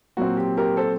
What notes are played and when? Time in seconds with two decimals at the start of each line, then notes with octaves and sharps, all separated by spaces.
0.17 A#2 F#3 C4 F#4
0.37 G4
0.57 G4 A#4
0.77 A4 C5